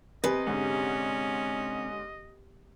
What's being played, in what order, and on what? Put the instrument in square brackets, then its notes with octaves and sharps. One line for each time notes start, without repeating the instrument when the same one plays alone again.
[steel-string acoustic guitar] C3 [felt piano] B4 G#5 [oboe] D#5
[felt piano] G#2 D3 [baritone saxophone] C#4